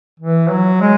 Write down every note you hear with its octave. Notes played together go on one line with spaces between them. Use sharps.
E3
F#3
G#3